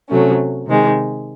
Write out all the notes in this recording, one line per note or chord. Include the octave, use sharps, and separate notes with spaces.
C3 F#3 A3 C#4
C3 D#3 G#3